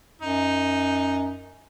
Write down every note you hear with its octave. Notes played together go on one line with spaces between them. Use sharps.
F#2 D#4